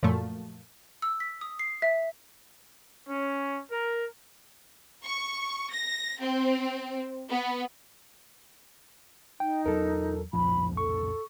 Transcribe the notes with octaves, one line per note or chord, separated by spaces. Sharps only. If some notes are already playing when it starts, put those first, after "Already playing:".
F#2 A#2 F3 A3
E6
B6
D#6
C7
E5
C#4
A#4
C#6
A#6
C4
B3
D#4 G5
E2 F#3 A4 A#4
C2 F2 A#2 F3 B5
A4 C#6